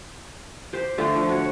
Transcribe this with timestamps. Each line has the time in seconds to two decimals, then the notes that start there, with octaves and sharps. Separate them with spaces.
0.73 G4 C5
0.98 D3 A3 F4
1.14 F3
1.29 F#4 C#5